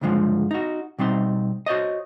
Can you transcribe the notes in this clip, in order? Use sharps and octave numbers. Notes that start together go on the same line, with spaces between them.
C#2 G2 D3 F3 G#3
D#4 F#4
B2 G3 C4 D#4 C6
F#4 C5 C#5 D#5